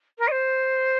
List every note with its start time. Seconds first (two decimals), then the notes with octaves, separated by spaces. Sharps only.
0.19 A#4
0.28 D#5
0.31 C5